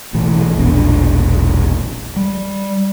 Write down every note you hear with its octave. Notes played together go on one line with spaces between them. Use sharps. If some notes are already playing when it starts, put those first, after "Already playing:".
B1 A2 E3
E1 A#1 B3 D4
G3